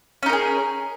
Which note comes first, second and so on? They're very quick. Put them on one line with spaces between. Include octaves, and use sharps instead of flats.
C#4 D#4 A#4 G#4